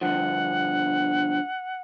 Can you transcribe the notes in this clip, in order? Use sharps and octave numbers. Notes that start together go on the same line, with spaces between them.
G2 D3 F3 F#5